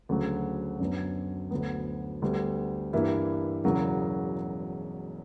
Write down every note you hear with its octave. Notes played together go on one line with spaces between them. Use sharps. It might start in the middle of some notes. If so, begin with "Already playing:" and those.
D2 C#3 F#3
F#2 D3 F#3 B3
D2 D3 F#3 B3
D2 D3 G3 B3
G2 E3 G3 A#3 E4
E1 E2 C#3 F#3 A#3